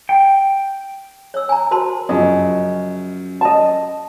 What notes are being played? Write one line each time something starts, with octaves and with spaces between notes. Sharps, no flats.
G5
C#5 E6
G#5 A#5
F#4 A#4 C5 A5 B5 C6
F#2 C#3 F3 D#5
D#5 A5